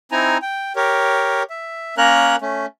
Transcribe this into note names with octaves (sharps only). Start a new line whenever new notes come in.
C4 D#4 E4 G#5 A#5
G5
G4 A#4 C#5
E5
A#3 C#4 A#4 C#5 A#5 F#6
A3 C#4